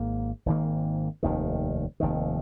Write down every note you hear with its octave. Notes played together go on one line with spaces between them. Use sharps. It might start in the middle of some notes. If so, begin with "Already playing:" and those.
Already playing: G#1 G#2 A#3
G#1 G#2 D#3 A#3
F1 D#2 D#3
F1 D#2 D#3